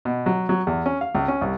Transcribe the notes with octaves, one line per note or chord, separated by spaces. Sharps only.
B2
F#3
F#3
E2
C#4
F5
C#2
C#4
C2